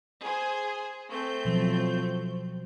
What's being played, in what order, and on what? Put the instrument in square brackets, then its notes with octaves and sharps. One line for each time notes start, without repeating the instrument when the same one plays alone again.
[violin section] G#4 C5
A3 C4 G6
[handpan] B2 F3 F#3